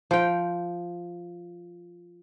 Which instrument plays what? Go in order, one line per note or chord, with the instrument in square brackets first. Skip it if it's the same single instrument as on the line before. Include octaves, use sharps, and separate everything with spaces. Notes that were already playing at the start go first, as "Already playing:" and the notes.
[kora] F3 G5